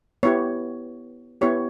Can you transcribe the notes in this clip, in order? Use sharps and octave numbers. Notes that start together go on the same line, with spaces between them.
B3 E4 G4 C#5
B3 E4 G4 C#5